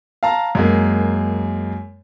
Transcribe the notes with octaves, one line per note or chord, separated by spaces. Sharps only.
F5 A5 A#5
F#2 G#3 A#3